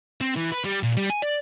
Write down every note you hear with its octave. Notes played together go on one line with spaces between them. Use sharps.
C4
E3
B4
G3
A#2
G3
G#5
D5